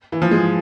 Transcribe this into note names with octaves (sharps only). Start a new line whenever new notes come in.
E3
F3
G#3